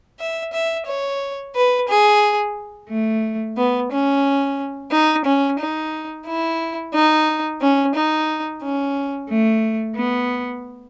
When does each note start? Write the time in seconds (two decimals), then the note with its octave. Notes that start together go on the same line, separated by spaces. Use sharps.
0.19 E5
0.53 E5
0.86 C#5
1.55 B4
1.87 G#4
2.90 A3
3.56 B3
3.91 C#4
4.91 D#4
5.25 C#4
5.58 D#4
6.26 E4
6.94 D#4
7.61 C#4
7.95 D#4
8.63 C#4
9.30 A3
9.97 B3